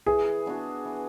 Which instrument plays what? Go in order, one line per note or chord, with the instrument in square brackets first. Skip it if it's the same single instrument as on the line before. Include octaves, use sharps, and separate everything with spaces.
[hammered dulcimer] E3 [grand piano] G#4
[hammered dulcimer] B3 D4 F#4
E3